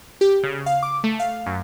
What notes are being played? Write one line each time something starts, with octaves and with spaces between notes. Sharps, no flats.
G4
C#3
F5
D6
A3
F5
F#2